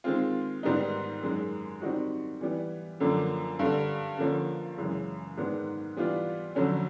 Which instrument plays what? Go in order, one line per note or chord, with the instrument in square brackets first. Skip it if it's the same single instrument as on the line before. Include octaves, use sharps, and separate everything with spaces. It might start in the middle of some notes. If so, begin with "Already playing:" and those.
[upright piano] D#3 G#3 C4 F4
G#2 D#3 G3 B3 D#4
F#2 D#3 G#3
D#3 G3 C4 D#4 F#4
E3 G3 B3
F#2 D3 F3 A#3 D4
G2 D3 G3
D3 F3 A#3 C#4
F#2 C#3 E3 G#3
G#2 D#3 G#3 B3 D4
E3 G3 B3 D4 F4
F2 D3 F#3 A3 C#4